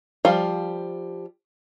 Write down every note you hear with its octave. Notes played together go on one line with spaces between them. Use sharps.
F3 G3 F5